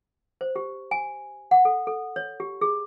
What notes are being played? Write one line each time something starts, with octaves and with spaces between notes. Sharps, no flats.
C5
G4
G#5
F#5
A4
A4
C#5
G4
G#4